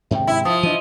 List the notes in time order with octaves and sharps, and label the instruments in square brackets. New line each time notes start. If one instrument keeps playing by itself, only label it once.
[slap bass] G#2 C3 D#3 [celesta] E5 G5
[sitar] E4
[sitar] F3 [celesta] D#6
[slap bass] E3 D4 [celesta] D#5 D#7